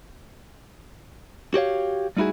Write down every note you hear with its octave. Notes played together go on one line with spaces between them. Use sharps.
F#4 G4 C#5 F5
G3 A3 D#4 E4 F#4 G#4